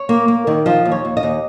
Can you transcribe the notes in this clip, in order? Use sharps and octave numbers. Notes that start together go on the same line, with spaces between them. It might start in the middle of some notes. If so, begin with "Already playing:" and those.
Already playing: C#5
A#3
A#3
D#3
F3 D#5
D#2
C#5
D#2
D#5
D#2